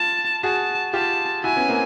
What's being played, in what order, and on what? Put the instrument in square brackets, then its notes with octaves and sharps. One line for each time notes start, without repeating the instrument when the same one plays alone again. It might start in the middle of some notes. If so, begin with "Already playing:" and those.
Already playing: [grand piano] F4 [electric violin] A5
[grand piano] F#4 G#4 [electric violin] A5
[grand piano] F4 G4 [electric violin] A5
[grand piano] E4 F#4 [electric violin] G#5
[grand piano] B3 C#4
A#3 C4